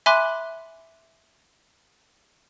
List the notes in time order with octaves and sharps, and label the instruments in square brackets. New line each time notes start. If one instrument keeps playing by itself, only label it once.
[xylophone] E5 G#5 B5 C6 D6 F#6